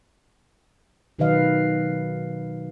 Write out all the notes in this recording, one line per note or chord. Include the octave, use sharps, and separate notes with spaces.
B2 D#3 F#3 B4 D#5 F5